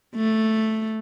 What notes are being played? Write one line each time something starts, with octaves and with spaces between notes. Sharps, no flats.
A3